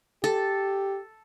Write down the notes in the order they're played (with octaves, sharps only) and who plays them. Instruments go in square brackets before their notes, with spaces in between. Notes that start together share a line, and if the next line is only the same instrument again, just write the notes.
[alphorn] G4 [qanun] A4